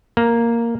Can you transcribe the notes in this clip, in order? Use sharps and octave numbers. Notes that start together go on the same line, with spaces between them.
A#3